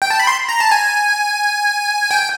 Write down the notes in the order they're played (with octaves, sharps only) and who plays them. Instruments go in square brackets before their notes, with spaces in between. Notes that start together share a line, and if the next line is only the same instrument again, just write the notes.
[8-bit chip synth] G5
A5
B5
C6
A#5
A5
G#5
G5